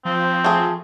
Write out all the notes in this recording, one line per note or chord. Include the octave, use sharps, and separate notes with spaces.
F3 C4
A3 G#4